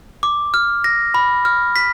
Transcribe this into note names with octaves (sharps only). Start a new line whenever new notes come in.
D6
F6
A#6
B5
F6
B6